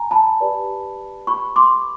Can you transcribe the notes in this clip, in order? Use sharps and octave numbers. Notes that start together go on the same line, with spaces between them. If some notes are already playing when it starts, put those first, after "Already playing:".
Already playing: G#5 A#5
A5 B5
G4 B4 D5
B5 C#6
C6 D6